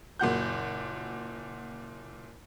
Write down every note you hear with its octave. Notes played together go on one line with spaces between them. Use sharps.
F#1 A#2 F#4 G6